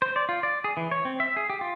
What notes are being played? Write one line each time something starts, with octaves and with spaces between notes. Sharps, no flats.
C5
D5
F4
D5
G#4
E3
C#5
C4
E5
G#4
G4
F4